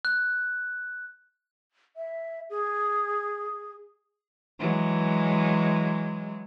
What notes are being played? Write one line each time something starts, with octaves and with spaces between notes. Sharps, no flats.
F#6
E5
G#4
E3 F#3 G#3